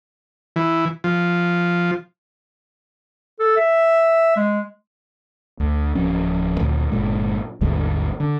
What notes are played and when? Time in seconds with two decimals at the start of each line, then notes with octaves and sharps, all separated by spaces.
0.56 E3
1.04 F3
3.40 A4
3.57 E5
4.36 G#3
5.60 D2
5.95 D1 F3 C#4
6.60 D2 A#2
6.92 G1 A#2 G#3
7.61 G#1 D#2 D3 G3
8.20 D3